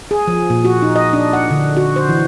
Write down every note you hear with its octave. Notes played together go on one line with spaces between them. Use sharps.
G#4
F3
A#2
F#4
D#4
D#5
D4
F#5
D3
F#4
C5
E3